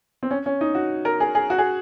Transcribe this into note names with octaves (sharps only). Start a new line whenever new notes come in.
C4
C#4
C#4
D#4
F#4
A#4
G#4
G#4
F#4
G#4